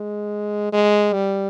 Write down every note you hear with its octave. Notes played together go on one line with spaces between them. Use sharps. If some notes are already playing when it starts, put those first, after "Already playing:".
Already playing: G#3
G#3
G3